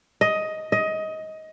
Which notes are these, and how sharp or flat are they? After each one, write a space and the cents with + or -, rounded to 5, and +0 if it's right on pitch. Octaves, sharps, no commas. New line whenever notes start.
D#5 +10
D#5 +20